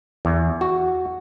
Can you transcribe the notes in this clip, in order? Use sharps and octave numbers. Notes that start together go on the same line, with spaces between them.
E2
F#4